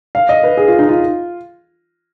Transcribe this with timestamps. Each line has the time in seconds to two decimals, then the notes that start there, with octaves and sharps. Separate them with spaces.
0.15 F5
0.29 D#5
0.43 B4
0.57 G#4
0.68 F4
0.79 D#4
0.89 F4